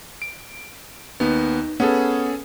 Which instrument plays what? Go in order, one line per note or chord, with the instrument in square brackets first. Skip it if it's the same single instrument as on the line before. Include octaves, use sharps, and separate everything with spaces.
[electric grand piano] D7
[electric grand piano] D#2 B3 [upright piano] D#4
[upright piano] B3 [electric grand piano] C#4 G#4 A4